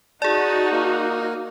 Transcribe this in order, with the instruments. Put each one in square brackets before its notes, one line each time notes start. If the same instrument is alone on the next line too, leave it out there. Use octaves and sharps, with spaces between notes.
[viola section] D#4 F#4 [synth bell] G#4 D5 [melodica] A5
[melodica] A#3